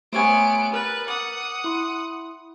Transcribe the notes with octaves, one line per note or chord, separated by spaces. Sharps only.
A3 B3 G4 C5 C#5 G#5 E6 D7
A#4 B4 F#6 A6
F#5 D6 D#6
E4 C6